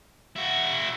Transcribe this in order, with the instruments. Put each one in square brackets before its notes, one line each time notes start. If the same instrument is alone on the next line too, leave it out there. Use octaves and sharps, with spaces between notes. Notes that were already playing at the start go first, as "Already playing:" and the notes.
[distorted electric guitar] E4 F#4